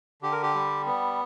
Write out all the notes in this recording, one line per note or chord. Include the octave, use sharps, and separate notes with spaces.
D3 G4
A#4
G4
G3
B3